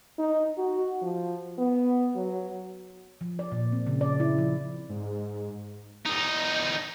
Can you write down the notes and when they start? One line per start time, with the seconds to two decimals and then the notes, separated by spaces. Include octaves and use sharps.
0.19 D#4
0.58 F#4
1.02 F3
1.58 B3
2.16 F#3
3.21 F3
3.39 D5
3.52 A#2
3.72 C4
3.87 C#3
4.01 D5
4.20 E4
4.38 F3
4.89 G#2
6.06 E2 D#4